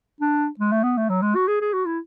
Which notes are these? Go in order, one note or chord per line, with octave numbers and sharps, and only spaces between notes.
D4
G#3
A3
B3
A3
F#3
G#3
F#4
G#4
G#4
F#4
E4